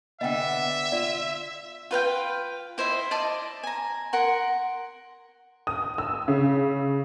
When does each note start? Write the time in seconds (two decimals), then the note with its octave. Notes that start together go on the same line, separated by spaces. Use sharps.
0.21 D3 B3 D#5 E5 F#5 G5
0.92 F4 D5
1.91 F4 B4 F5 G5
2.78 E4 C5 D#5 E5
3.11 D5 D#5 A5 C6
3.63 G#5 A#5
4.13 A#4 F#5 C6
5.67 D#6
5.98 E6
6.28 C#3